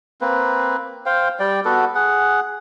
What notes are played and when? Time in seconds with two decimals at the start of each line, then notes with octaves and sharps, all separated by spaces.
0.21 A#3 C4 B4
1.06 C5 F5 G5
1.39 G3 D5 G5
1.65 B3 F#4 A4 B4
1.95 G#4 F#5